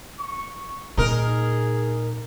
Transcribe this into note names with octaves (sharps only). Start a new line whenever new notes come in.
C#6
A#2 D#4 G#4 A#4